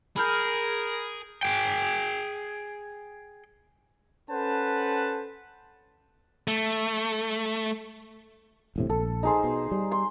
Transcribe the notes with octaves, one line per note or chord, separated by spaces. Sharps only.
G#4 A#4 B5 F6 G6
G#4 G5
C#4 A4 B4 C5 F#5 A5
A3
E1 A2 C3
A#1 A4
D#4 G#4 C5
B2
G3
C6